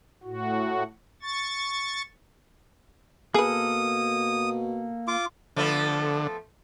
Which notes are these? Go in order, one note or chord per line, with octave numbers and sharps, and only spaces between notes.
A2 F#4
C#6 A6
B2 A#3 G#4 A4 B4 D#6
F4 D6
D3 F3 A3 B3